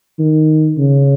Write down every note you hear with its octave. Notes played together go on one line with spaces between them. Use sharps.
D#3
C#3